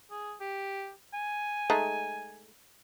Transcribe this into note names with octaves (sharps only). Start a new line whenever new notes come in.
G#4
G4
G#5
G#3 A3 D#4